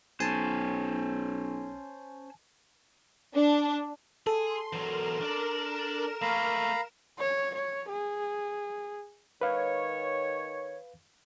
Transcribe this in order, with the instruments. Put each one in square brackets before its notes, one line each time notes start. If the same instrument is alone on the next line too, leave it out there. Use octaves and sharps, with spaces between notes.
[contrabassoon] B1 [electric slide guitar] C#4 C5 [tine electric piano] G#5 A5
[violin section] D4
[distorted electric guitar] G#4 [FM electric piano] A4 [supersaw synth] C6
[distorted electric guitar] E2 F#3 [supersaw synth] A#4 E7
[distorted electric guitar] D4 D5
[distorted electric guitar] A3 A#3 [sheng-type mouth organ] F5 A#5 B5
[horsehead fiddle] C#5
C#5
G#4
[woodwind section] D#3 C#5 [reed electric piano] B4 F5